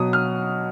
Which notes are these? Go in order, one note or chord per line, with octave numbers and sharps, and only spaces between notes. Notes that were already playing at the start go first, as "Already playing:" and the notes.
Already playing: B2 F#3 D#6
F6